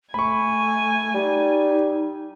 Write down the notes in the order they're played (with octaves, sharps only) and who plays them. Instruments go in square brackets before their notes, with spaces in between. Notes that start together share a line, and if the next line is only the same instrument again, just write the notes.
[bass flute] A3 [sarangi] G#5 [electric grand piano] B5 C#6
[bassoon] G3 [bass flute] D#4